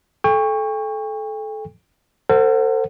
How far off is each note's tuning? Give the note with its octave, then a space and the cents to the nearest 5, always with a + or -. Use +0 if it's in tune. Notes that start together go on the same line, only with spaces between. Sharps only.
A4 -25 G5 +40 C#6 +0
A4 +45 C5 +0 F#5 +0